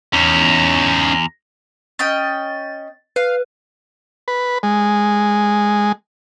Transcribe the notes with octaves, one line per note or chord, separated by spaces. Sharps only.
E2 C#4 D#4
C#4 D#5 G5 A6
B4 F5
B4
G#3